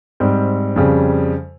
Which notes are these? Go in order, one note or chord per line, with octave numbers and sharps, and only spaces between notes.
G#2 G3 C4
F2 C#3 G3